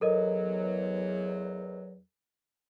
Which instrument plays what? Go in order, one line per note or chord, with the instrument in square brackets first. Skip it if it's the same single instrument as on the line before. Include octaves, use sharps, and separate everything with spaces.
[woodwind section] E2 F#3 [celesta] A4 A#4 D#5